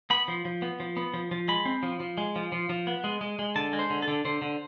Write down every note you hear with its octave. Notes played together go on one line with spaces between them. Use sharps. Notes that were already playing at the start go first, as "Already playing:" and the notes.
B3 B5
F3
F3
B3
F3
B3
F3
F3
G#3 B5
C4
F3
F3
G#3
F3
F3
F3
B3
G#3
G#3
G#3
D3 A5
G#3
C5
D3
A4
D3
D3 C5
D3